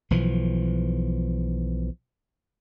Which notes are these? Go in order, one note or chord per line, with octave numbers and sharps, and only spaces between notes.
B1 E3 F3